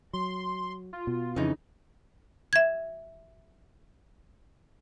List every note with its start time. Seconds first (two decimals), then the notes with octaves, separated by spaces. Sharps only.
0.13 F#3 C6
0.93 F4
1.07 B2
1.36 F2 C#3 E3 D#4
2.53 E5 G#6